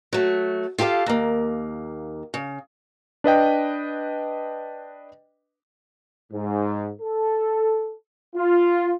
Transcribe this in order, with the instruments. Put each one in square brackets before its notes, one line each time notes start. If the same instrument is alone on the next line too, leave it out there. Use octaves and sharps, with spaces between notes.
[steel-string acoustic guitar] F#3 A3
F4 G4 A4 D5 F5
D#2 A#3
C#3
[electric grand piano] D4 B4 D#5 G5
[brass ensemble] G#2
A4
F4